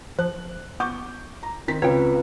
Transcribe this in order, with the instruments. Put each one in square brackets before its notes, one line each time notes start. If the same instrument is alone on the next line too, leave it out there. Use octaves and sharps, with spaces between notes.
[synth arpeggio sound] F3 [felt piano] F#6
[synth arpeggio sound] B3 [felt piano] C#6 D6 G6
[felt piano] A#5
D#3 C4 B6
[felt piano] C#2 [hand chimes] C4 F4 B4 [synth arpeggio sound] C#5 G5